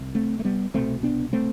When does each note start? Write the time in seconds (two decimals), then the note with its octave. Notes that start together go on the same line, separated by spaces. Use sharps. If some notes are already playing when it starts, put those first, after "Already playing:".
Already playing: C2
0.15 A3 C4
0.39 A3
0.45 G3 B3
0.74 C2 B2 A3 C4
1.03 B3 D4
1.33 A3 C4